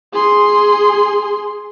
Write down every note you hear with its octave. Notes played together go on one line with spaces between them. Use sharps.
G#4 C6